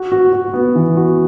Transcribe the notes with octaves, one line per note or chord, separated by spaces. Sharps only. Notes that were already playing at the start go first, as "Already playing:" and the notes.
Already playing: F#4
F#4
F#4
B3
E3
F#4